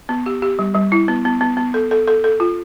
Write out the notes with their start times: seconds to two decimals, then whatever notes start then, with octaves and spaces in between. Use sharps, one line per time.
0.09 B3
0.26 G4
0.42 G4
0.59 G3
0.75 G3
0.92 E4
1.08 B3
1.25 B3
1.41 B3
1.57 B3
1.74 A4
1.91 A4
2.08 A4
2.24 A4
2.40 F4